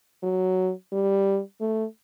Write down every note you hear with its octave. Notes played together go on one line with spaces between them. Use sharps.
F#3
G3
A3